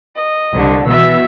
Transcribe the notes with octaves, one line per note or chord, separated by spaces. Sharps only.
D#5
C2 D3
B2 E3 E5 E6